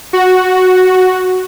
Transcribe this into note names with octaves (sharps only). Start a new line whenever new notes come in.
F#4